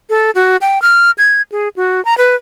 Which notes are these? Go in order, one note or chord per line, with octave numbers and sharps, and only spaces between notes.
A4
F#4
G5
F6
G#6
G#4
F#4
A#5
B4